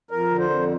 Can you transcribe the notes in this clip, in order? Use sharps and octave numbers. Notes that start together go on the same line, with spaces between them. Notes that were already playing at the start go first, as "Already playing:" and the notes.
F2 A#4
D3
C5
F2